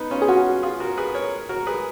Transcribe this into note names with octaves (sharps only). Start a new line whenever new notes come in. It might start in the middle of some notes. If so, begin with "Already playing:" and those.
Already playing: B3 D#4
C#4 F4
G#4
C#4 F4 F#4
F4 G#4
F#4 A#4
G#4 B4
A#4 C#5
F#4 A#4
G#4 B4